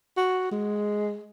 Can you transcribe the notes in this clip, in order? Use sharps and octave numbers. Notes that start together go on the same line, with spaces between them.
F#4
G#3